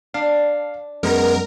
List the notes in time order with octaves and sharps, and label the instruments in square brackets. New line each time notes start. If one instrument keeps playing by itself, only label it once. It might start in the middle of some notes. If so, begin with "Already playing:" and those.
[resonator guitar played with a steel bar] D4 [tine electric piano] F5
[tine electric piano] F#2 G#3 B3 [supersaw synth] A#4